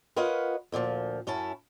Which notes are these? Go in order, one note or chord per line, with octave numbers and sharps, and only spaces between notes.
F4 A#4 B4 C#5 D#5 F#5
D2 A#2 E3 F3
F#2 C#4 E4 A5